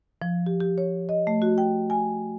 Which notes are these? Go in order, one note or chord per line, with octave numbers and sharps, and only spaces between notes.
F3
G4
G4
C#5
D#5
A3
F#4
G5
G#5